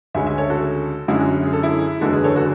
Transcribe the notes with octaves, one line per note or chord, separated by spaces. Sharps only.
D2 C#3 G#3 C#4 E5 G#5
E5 G#5
A4 C#5
F#4 A4
F#2 D3 G#3 C#4 E4 G#4
F#4
G#4
A4
E4 G#4
F#1 E2 D3 G#3 F#4 A4
G#4 B4
A4 C#5
F#4 A4